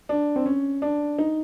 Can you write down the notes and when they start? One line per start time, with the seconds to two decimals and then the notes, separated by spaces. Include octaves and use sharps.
0.09 D4
0.36 C4
0.46 C#4
0.82 D4
1.19 D#4